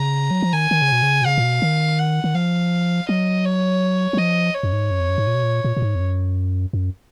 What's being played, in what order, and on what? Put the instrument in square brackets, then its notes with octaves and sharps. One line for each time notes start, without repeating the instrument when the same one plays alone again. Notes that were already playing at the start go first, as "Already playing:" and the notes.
Already playing: [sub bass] C#3 [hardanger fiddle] A#5
[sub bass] F#3
F3
[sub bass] D#3 [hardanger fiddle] G#5
[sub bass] D#3
C#3
B2
C#3
B2
[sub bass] C#3 [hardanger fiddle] F5
[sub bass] A#2
B2
D#3
[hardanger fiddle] F#5
[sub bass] D#3
[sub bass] F3 [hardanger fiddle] F5
[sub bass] F#3 [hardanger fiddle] D#5
[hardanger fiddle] C#5
[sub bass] F#3
[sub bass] F3 [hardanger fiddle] D#5
[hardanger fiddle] C#5
[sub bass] F#2
G#2
F#2
F2
F#2
G#2
A#2
B2
A#2
A#2
A#2
G#2
F2
F#2
F#2